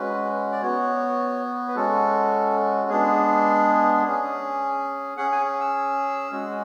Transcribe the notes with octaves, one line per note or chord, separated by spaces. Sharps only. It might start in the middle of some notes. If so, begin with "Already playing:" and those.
Already playing: G#3 C#4 F#4 B4
D5
B3 F#4 C#5
B4
G#3 C#4 F#4 A4
G#3 B3 D4 G#4
C#4 G#4
C#4 G#4 F#5
G#5
E6
G#3 C#4 F#4